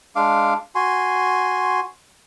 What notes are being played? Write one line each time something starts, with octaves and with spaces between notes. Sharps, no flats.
G#3 D4 F5 D6
F#4 G#5 C6